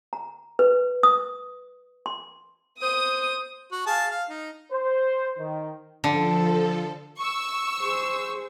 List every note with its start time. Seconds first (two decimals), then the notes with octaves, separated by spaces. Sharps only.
0.13 A#5
0.59 B4
1.03 D#6
2.06 C6
2.82 C5 D#6
3.71 F#4
3.87 G#4 F5 A5
4.11 F5
4.29 D#4
4.72 C5
5.39 D#3
6.04 D3 F3 A4
7.18 C#6 E6
7.82 G#4 C5